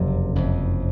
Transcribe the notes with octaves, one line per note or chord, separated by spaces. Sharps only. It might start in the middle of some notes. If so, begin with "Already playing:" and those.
Already playing: F#1 F2 C3
F#1 F2 C3